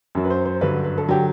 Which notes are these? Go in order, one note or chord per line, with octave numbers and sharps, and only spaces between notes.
F#2 F#3
B4
C5
C5
G2 D3 F#3 B4
B4
A4
D3 F#3 G4